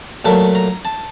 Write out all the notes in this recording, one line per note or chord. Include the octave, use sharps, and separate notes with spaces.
A#2 F#3 A3 A5
A#5
A5